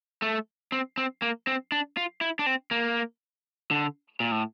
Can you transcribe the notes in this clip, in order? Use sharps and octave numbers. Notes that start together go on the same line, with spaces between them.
A3
C4
C4
A#3
C4
D4
F4
E4
D4
C4
A#3
D3
A#2
A2